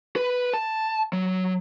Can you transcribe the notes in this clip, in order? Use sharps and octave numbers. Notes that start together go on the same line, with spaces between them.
B4
A5
F#3